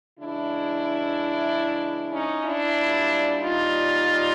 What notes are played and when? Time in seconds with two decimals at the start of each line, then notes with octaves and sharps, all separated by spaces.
0.20 C#3 E3 G#3 D4 E4
2.12 C#4 D#4
2.44 D4 E4
2.76 A#2 G3
3.41 D#4 F4